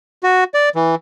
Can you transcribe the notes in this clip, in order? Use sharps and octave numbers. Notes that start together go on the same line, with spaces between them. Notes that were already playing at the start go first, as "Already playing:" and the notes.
F#4
D5
E3